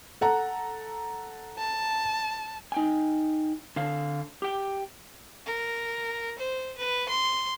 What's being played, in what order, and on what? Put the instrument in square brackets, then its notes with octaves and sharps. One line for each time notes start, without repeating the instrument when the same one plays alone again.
[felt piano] A4 F#5 A#5
[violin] A5
[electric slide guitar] D#4 G5 G#5
D3 F5
G4 G5
[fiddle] A#4
C5
B4
C6